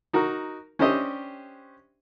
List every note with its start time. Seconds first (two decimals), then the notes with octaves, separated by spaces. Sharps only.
0.13 D#4 F#4 A#4
0.79 C#4 D4 G4 C5 D#5 E5